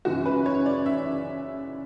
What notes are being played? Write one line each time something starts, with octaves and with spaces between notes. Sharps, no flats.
F#2 C#3 E3 G#3 F#4
B4
C#5
D5
E5